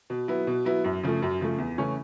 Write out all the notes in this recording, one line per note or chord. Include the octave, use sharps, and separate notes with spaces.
B2
F#3 B3 E4
B2
F#3 B3 E4
F#2
C#3 F3 A3
F#2
C#3 F3 A3
E2
C#3 E3 A3 C#4